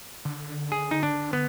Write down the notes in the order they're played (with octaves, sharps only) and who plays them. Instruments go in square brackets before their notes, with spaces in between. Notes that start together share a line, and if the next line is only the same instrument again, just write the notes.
[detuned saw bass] D3
[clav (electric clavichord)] G#4
D#4
D4
B3